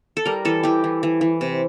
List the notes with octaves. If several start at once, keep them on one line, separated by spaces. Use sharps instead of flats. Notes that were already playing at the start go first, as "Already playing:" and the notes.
A4
G3 A#4
E3 A4
E3 G4
E3
E3
E3
C3